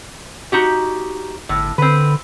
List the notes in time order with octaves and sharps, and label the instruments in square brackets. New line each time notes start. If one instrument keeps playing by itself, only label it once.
[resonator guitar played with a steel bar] D#4 F#4 G4
[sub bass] G1 [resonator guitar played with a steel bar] A2
[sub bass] D3 [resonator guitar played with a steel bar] C4 B4